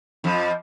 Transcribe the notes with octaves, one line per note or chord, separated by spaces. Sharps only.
F2 F3